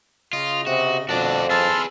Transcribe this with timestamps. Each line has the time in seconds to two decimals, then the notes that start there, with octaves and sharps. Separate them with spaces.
0.33 C#3 F4 D#5
0.67 C3 F#4
1.09 F2 B2 D4 F#4 D5 A5
1.50 G#4 B4 A5 C6 E6 F6